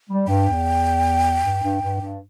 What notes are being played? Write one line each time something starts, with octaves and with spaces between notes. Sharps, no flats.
G3
G2 G5
E2
G2
G2
G2
G2